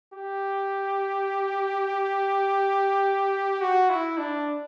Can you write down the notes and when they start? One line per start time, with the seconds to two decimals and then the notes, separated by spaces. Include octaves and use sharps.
0.14 G4
3.61 F#4
3.90 E4
4.18 D4